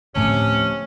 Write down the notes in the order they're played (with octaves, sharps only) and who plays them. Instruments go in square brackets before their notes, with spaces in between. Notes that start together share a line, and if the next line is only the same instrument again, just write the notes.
[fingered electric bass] D2 A2 F3 [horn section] C3 C#4 [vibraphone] A3